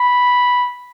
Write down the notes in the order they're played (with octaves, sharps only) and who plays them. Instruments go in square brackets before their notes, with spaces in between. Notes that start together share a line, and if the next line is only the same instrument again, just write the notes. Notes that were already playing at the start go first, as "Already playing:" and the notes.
Already playing: [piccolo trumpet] B5